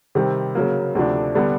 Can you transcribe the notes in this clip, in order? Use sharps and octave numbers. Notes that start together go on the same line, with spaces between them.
C3 D#3 G3 C4
C#3 F#3 A#3
D2 C3 F3 A3 D4
D3 G3 B3 D4